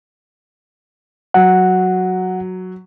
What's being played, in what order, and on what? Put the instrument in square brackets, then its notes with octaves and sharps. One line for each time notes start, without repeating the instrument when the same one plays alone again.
[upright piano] F#3 [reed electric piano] F#5